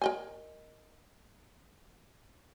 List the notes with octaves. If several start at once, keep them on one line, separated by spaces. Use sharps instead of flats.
A#4 D#5 G#5